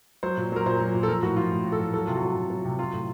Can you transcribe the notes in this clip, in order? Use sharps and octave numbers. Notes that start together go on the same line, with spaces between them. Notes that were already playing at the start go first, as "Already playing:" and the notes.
F#3 C5
A#2
F#3 A#4
A#2 C5
F#3
A#2
A4
F3 A#4
A2 F#4
F3 F4
A2
F3
A4
A2
F#3 A4
C3 F4
F#4
F#3
C3
F#3
C3
F#3 F4
A2